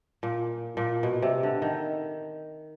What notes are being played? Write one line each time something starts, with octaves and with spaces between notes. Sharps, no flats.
A#2
A#2
B2
C3
D3
D#3